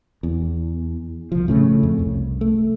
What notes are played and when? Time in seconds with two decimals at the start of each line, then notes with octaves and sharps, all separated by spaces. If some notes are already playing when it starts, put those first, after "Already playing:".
0.23 E2
1.32 C2 F3
1.48 A2 C#3 G3 A3
1.83 F2
1.99 C2
2.41 A3